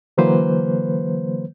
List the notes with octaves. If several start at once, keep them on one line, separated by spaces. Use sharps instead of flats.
D3 E3 F#3 A#3 B4 C5